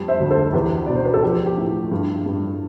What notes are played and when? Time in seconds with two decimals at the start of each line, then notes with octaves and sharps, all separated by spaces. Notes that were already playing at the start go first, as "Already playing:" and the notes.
Already playing: F2 G3
0.08 C5 E5
0.20 D2
0.31 A4 C5
0.53 E2 G4 B4
0.86 B2 D5
0.96 C5
1.05 B4
1.14 A4
1.23 F3 G4
1.46 G4
1.58 A2
1.91 G2
2.26 G2